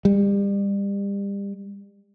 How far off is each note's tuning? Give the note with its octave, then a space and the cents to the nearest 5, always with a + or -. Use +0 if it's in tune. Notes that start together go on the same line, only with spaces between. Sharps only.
G3 +30